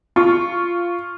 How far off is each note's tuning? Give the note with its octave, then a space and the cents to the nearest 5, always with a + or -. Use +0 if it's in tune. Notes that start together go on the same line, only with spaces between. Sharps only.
F4 -10 C#6 +0